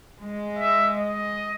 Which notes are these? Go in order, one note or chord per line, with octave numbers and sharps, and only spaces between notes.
G#3
E5
D#5